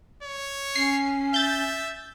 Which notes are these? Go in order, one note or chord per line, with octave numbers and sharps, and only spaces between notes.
C#5
C#4 C7
E5 G6 A6